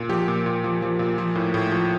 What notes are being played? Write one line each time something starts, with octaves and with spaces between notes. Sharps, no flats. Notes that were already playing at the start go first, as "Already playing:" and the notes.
Already playing: A#2
F3 G4
A#2
A#2
F3
F3
A#2
F3
A2
A2
F3